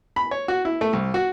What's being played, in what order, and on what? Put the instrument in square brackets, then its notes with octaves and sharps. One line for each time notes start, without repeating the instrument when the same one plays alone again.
[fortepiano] B5
C#5
F#4
E4
A3
C2
F#4